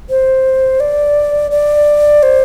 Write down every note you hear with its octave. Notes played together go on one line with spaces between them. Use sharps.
C5
D5
D5
C5